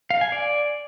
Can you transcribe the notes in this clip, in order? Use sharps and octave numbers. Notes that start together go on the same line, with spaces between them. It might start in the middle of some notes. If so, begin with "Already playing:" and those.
F5
G#5
D5